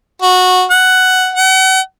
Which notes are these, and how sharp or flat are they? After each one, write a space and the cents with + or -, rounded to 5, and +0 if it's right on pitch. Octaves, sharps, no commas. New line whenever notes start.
F#4 -15
F#5 +10
F#5 +40